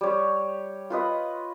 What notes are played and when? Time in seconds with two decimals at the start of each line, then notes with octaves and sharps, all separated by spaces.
0.01 G3 C#5
0.90 F4 B4 D#5